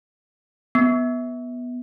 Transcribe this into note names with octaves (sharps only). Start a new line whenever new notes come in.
B3